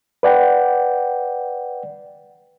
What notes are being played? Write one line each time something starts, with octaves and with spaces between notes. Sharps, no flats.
B4 D5 F#5 G5